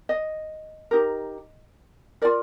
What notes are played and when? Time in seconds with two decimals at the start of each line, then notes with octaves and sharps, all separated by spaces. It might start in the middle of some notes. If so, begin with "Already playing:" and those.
0.09 D#5
0.91 D#4 G4 A#4
2.22 F4 A#4 D5